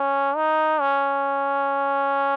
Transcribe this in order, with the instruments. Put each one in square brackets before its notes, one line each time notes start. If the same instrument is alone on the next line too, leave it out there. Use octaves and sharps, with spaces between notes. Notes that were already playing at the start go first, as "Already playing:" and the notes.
Already playing: [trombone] C#4
D#4
C#4